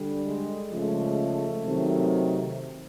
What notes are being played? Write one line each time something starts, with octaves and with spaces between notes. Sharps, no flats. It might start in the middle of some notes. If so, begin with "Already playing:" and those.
Already playing: D3 G3
G#3
C#3 F3 G#3 A3
C3 D#3 F#3